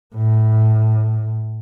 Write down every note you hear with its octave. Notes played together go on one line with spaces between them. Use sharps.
A2